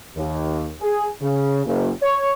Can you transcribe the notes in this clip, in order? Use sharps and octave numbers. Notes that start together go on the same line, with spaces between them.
D#2
G#4
C#3
F#1
C#5